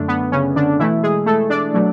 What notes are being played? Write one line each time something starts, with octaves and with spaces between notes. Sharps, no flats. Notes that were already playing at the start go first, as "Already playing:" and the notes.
Already playing: F#2 D3 A3 D4
B3
C#3 C#4
D3 D4
B2 E3 A3 E4
G#3 G#4
A3 A4
D4 D5
B2 F#3 A3